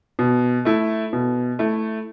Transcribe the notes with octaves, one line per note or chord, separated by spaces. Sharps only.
B2
A3 E4
B2
A3 E4